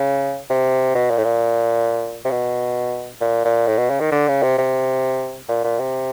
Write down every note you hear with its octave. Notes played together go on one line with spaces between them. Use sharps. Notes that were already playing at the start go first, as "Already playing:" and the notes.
Already playing: C#3
C3
B2
A#2
A2
A#2
C3
B2
A#2
A#2
A2
B2
C#3
D#3
D3
C#3
C3
C3
A#2
A#2
C3